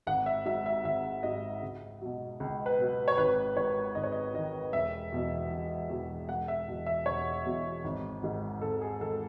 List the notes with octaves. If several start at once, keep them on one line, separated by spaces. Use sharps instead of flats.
G#1 F#5
E5
G#2 F#3 E5
E5
G#1 E5
G#2 F#3 D#5
C#2
B2 F#3
C#2
B4
B2 F#3
C#5
G#1 B4
G#2 D#3 C#5
G#1 D#5
C#5
D#5
G#2 D#3 D#5
E1 E5
E2 B2 F#3
E1
E2 B2 F#3
E1 F#5
E5
E2 B2 F#3
E5
E1 C#5
E2 B2 F#3
G#1
G#2 D#3
G#1 A4
G#4
D#3 A4